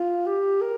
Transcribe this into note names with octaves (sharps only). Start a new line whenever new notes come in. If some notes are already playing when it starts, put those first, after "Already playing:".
Already playing: F4
G4
A#4